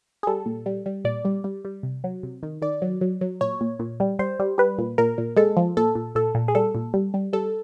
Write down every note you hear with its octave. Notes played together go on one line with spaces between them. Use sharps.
G#4
G3 A4
A#2
G3
G3
A#2 D5
G3
G3
G3
C3
F#3
C3
D#3
D#3 D5
F#3
F#3
F#3
A#2 C#5
A#2
A#2
G3
G3 C5
G3
G3 B4
A#2
A#2 A#4
A#2
G#3 A4
F3
A#2 A4
A#2
A#2 A4
A#2
G#4
G3 A4
A#2
G3
G3
G3 A4